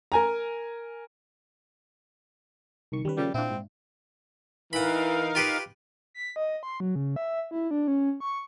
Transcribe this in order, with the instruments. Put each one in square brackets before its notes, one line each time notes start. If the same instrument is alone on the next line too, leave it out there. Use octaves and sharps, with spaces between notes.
[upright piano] A#4 G#5 A#5
[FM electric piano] C2 D#3 C#6
[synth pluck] D#3 C#4 [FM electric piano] G3 B4
[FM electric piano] C#3 F3 A#3 [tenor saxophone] G3
[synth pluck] A#2 D4 [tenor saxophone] C4 [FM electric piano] E4 F4
[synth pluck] G#2
[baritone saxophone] E3 [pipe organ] D#4 A#4 F5 [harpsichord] F#5 B5
[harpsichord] F4 G4 B4
[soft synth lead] B6
D#5
C6
F#3
C#3
E5
E4
D4
C#4
C#6